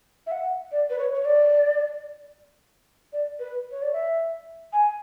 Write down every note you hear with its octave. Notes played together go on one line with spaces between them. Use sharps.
E5
F#5
D5
B4
C#5
C#5
D5
D5
B4
C#5
D5
E5
G#5